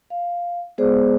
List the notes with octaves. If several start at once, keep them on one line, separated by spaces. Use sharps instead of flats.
F5
G#3 B3 G#4 C5 D5